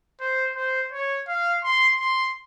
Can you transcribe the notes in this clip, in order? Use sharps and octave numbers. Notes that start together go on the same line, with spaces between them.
C5
C5
C#5
F5
C6
C6